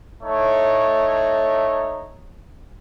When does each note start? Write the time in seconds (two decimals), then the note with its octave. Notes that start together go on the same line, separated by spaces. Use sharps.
0.24 A3 D#4 C#5